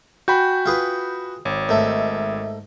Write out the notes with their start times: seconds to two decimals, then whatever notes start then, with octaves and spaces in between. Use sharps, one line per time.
0.28 F#4 G5 G#5 B5 G6
0.66 F4 G#4 B4
1.45 G#1 C#5
1.69 G#2 A3 A#4 D#5 E5